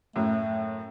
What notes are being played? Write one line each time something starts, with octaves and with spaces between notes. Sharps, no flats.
F#2 A2 A3